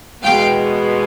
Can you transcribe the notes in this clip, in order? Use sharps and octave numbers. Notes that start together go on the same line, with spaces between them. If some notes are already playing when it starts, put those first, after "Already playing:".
E2 B2 G#3 B3 F5 G5